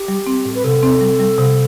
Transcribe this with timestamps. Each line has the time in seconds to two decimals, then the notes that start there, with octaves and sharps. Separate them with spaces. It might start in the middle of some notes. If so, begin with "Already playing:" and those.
Already playing: G4
0.08 G3
0.27 C4
0.45 A2
0.55 B4
0.64 C3 A4
0.83 C4
1.01 G3
1.20 G3
1.38 C3